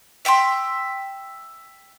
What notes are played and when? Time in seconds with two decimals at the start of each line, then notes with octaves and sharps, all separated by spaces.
0.25 E5 G5 A#5 C6